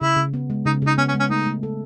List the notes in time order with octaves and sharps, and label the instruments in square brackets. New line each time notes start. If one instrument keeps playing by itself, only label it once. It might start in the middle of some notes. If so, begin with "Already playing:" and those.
[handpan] C#3 [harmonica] E4
[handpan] C#3
B3
G#3
[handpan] C#3 [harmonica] D#4
[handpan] C#3
[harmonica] D#4
[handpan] B3 [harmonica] C#4
[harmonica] C#4
[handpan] G#3
[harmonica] C#4
[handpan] A3 [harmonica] D#4
[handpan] A3
A4